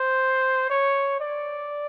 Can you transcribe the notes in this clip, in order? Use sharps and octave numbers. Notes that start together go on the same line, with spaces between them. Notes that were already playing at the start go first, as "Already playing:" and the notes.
Already playing: C5
C#5
D5